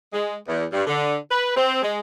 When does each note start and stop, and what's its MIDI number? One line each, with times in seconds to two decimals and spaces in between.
0.13 0.34 56
0.48 0.64 40
0.72 0.82 43
0.87 1.15 50
1.30 1.55 71
1.56 1.79 60
1.82 1.99 56